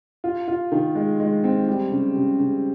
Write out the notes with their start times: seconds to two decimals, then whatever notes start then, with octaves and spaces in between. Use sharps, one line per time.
0.24 F4
0.48 F4
0.72 D#3
0.95 G#3
1.20 G#3
1.44 C4
1.68 G3
1.91 C#3
2.16 C#3
2.39 C#3